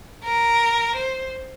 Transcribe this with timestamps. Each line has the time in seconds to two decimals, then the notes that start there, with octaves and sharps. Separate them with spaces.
0.24 A#4
0.96 C5